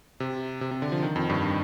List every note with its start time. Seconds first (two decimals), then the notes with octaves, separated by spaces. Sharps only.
0.20 C3
0.61 C3
0.71 C3
0.82 D3
0.92 F3
1.02 D#3
1.16 F2
1.30 G2